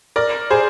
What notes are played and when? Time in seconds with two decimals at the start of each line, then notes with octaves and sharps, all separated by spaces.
0.16 A#4 D5
0.51 G#4 C5